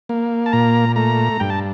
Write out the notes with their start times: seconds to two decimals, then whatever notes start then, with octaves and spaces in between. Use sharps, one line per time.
0.09 A#3
0.46 A5
0.53 A#2 A#5
0.96 A3 A#5
1.40 G2 G5
1.50 A5